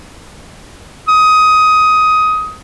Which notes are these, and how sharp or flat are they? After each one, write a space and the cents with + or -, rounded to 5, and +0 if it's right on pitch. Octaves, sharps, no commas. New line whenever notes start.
D#6 +15